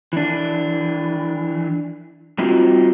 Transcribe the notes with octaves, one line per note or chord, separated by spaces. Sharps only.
E3 D4
G3 C4 D#4 F4 F#4